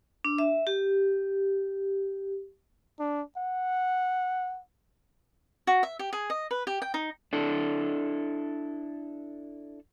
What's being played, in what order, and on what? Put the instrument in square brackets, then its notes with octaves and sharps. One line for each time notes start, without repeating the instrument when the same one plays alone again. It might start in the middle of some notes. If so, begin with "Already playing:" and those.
[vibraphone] D4
E5
G4
[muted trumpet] D4
F#5
[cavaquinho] F#4
E5
G4
G#4
D#5
B4
G4
G5
D#4
[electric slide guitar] D4 E4 A4